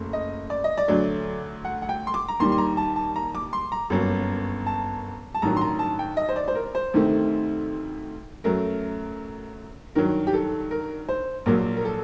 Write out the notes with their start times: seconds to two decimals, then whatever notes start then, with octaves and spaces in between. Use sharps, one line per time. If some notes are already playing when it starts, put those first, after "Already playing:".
Already playing: F#1 F#2 A3
0.13 D#5
0.50 D5
0.64 D#5
0.78 D5
0.88 D2 D3 F#3 A3
1.65 F#5
1.82 F#5
1.89 G5
2.07 C6
2.14 D6
2.28 A#5
2.39 D#2 D#3 G3 C6
2.52 C6
2.58 A#5
2.77 A5
2.96 A5
3.16 A#5
3.35 D6
3.53 C6
3.72 A#5
3.90 G1 F#2 F#3 A#3
4.66 A5
5.34 A5
5.42 A1 G2 D#3 F#3 A#5
5.57 C6
5.61 A#5
5.79 A5
5.99 G5
6.17 D#5
6.29 C5
6.36 D5
6.48 C5
6.55 A#4
6.75 C5
6.94 D2 C3 D#3 A3
8.44 F#2 F#3 A3 A#4
9.95 G2 D#3 F#3 A#4
10.27 G4
10.34 A4
10.71 A#4
11.09 C5
11.46 A#1 A#2 F#3 A#3 A#4
11.77 A#4
11.85 A4